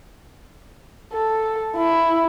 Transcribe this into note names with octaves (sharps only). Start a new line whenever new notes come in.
A4
E4